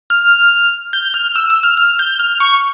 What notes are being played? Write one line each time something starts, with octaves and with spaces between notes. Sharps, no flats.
F6
G6
F6
E6
E6
F6
F6
G6
F6
C#6